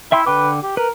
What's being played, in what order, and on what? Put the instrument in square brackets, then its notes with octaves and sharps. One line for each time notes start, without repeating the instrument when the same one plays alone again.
[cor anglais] E4 [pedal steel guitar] E5 G5 C6
[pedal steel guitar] D3 G5 D6 [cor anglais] B4
[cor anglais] G4
[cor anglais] A#4 [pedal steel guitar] B4